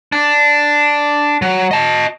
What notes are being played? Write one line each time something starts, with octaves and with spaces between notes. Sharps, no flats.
D4
F#3
D#5 A5